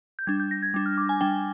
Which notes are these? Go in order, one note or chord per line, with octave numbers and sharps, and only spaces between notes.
G6
G3 D4 G#6
G6
A#6
G#6
G3 D4
F6
D6
G#5
G3 D4 G5